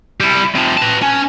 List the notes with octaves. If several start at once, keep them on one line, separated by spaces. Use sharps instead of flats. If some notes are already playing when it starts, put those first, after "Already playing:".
G3 E4
C3 F3
B4 A5
C#4